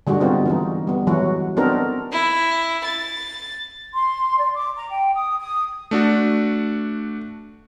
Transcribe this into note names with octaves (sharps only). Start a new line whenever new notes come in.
D3 G3 G#3 F#4
B3 C4 D#4 F4
E3 G#3 D#4
G3 B3
E3 F#3 G#3 F#4
B3 C4 D4 D#4 A4 A#4
E4
A6
C6
D5
D6
A#5
G5
D#6
D#6
A3 D4 F#4